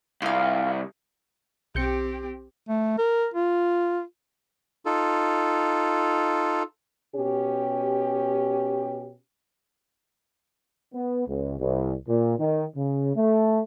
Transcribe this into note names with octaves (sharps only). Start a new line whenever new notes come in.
C2 F4 F5
B1 C4 G4 G6 C#7
A3
A#4
F4
D#4 F4 A4
B2 C#4 G4
B3
C#2
C2
A#2
D#3
C#3
A3